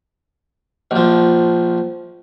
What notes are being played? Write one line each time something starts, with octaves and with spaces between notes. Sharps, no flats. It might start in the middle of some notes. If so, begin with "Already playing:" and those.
A#1 F3